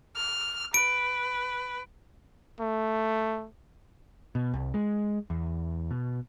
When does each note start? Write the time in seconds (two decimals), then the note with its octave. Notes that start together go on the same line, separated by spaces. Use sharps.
0.16 F6
0.74 B4 D7
2.60 A3
4.35 B2
4.54 C2
4.74 G#3
5.30 E2
5.91 B2